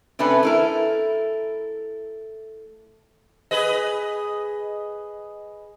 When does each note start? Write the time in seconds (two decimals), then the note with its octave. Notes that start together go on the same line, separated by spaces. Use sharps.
0.19 C3 A3 C#4 D4 B4
0.43 A3 E4 A#4
3.51 G#4 B4 D#5